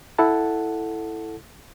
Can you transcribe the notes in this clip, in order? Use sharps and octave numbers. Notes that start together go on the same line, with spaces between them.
E4 A4 F#5 A5